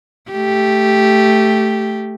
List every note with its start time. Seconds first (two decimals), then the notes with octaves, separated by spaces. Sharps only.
0.31 A3 G4